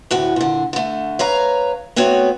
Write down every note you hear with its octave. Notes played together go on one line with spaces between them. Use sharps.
D2 A2 F#4
A#2 D3
D3 A3
B4 C#5 F5 A#5
A3 B3 C4 F#4 C#5